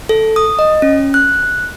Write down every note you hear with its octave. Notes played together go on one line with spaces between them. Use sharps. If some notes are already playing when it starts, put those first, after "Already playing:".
A4
D#6
D#5
C#4
F#6